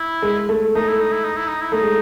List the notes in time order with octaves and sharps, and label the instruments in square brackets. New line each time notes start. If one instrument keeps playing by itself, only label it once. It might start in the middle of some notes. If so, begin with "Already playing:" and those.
Already playing: [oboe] E4
[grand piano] G#3
A3
[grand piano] A3 [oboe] D#4
[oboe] E4
D#4
E4
D#4
E4
D#4
E4
[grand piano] A3 [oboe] D#4
[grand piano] G#3